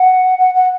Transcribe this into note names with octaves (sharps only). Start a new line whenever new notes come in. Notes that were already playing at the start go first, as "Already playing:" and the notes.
Already playing: F#5
F#5
F#5